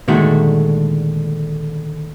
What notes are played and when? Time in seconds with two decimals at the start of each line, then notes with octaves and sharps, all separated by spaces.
0.08 A#2 D3 D#3 G#3 A3 F#4